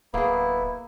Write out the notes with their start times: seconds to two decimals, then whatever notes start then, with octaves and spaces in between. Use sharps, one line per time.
0.14 D1 A#3 B3 E4 G#4